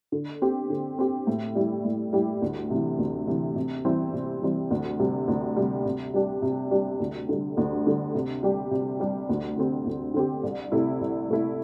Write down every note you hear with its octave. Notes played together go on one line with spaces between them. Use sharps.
D3
C4 G4
D3
C4 G4
A2
G3 E4 G4
A2
G3 E4 G4
D2
C3 E3
D2
C3 E3
C3
E3 G3 C4
C3
E3 G3 C4
D2
C3 G3
D2
C3 G3
C3
G3 D4 G4
C3
G3 D4 G4
D2
D3 G3
D2
D3 G3
C3
G3 D4 G4
C3
G3 D4 G4
D2
D3 C4 G4
D2
D3 C4 G4
C2
C3 A3 E4
C2
C3 A3 E4